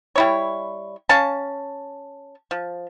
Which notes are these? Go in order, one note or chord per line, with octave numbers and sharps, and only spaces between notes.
G3 E4 C#5
C#4 F5 A5
F3